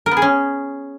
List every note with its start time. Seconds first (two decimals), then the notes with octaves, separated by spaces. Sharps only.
0.06 A#4
0.11 B3
0.17 G#4
0.22 C#4